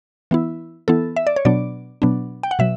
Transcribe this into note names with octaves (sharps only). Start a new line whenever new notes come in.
E3 B3 E4
E3 B3 E4 A4
E5
D5
C#5
B2 F#3 B3 D4 D5
B2 F#3 B3 D4
G5
F#5
B2 F#3 E5